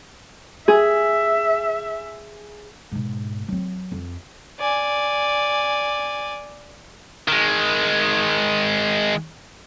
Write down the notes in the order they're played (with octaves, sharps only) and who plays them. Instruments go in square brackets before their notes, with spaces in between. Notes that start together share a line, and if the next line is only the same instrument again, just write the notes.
[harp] G#4 [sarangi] E5
[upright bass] G#2 B2
F#3 C4
F2
[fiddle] D5 G#5
[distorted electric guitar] D#3 G#3